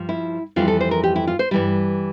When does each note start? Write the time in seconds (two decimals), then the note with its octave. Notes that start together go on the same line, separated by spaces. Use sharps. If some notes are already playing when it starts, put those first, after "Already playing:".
Already playing: G2 F3
0.09 E4
0.56 F2 E3 G3 F4
0.68 A4
0.80 C5
0.91 A#4
1.03 G4
1.16 E4
1.27 F4
1.39 C5
1.51 G2 E3 G3